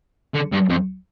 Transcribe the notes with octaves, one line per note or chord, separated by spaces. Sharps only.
D3
G2
F2